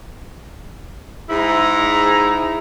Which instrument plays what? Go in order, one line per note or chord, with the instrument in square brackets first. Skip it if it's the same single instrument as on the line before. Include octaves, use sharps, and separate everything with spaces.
[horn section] G#2 E4 A#5